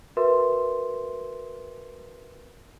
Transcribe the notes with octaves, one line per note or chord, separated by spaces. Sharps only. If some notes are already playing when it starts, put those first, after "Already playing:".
F#4 A#4 B4 E5 C6